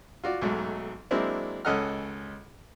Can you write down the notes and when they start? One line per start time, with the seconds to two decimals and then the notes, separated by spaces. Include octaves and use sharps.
0.24 F4 F#4 D5
0.42 B1 G#2 F#3 A3
1.11 F#3 G#3 A#3 C4 D4 E4
1.65 C#2 C#4 A4 D#5 F#5 F6